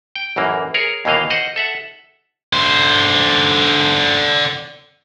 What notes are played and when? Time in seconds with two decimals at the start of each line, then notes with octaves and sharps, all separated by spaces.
0.16 G5
0.36 A1 F#2 E3 A#3
0.74 G#4 A#4 C#5
1.05 D#2 B2 E3 A#3 D#5 F5
1.30 C5 D#5 F#5
1.56 A4 E5 F#5
2.53 D3 C5